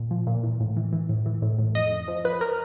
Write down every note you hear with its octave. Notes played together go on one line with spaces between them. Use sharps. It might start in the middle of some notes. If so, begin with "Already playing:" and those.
Already playing: A#2
F3
A#2
E3
A2
E3
E3
A2
E3
A2
A2
F2 D#5
F2
F3
F3 B4
A#4